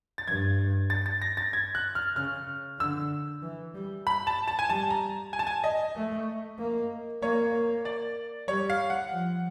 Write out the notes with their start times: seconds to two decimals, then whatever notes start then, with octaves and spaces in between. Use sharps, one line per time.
0.18 A6
0.27 G2 G#6
0.90 A6
1.06 A6
1.22 A#6
1.37 A6
1.53 G#6
1.75 F#6
1.95 F6
2.16 C#3 F6
2.79 D3 E6
3.42 E3
3.74 G3
4.07 B5
4.27 A5
4.48 A5
4.59 G#5
4.69 G3 A5
4.90 A#5
5.33 G#5
5.39 A5
5.47 G#5
5.64 D#5
5.96 A3
6.59 A#3
7.22 A#3 C#5
7.85 D5
8.48 G3 C#5
8.70 F5
8.90 F#5
9.11 F3